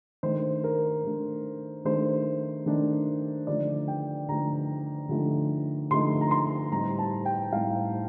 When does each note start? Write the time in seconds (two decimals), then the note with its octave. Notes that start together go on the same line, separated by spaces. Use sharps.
0.23 D#3 A3 D4 C5
0.64 A#4
1.04 D#3 A3 D4
1.85 D#3 A3 D4 C5
2.66 D#3 A3 D4
3.47 D3 F3 A3 D#4 D5
3.88 G5
4.29 D3 F3 A3 D#4 A#5
5.09 D3 F3 A3 D#4
5.91 D3 F3 A3 D#4 C6
6.21 A#5
6.31 C6
6.72 A2 G3 C4 D#4 A#5
6.99 A5
7.26 G5
7.52 A2 G3 C4 D#4 F5